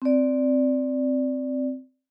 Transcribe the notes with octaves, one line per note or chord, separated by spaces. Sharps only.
C4 D5